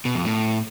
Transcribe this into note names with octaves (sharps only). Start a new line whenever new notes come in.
B2
F2
A2